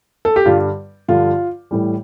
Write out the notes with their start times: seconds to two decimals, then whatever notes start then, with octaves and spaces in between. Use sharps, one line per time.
0.25 A4
0.36 G4
0.45 G2 D3 G3 F4
1.08 G2 D3 F3 F4
1.71 A2 E3 G3